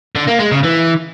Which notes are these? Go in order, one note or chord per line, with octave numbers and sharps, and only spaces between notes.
D3
A#3
G#3
C#3
E3